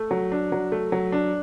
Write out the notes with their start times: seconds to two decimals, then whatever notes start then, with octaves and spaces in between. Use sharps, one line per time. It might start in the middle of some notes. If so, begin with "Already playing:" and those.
Already playing: A3
0.11 F#3
0.32 D4
0.52 F#3
0.72 A3
0.92 F#3
1.12 D4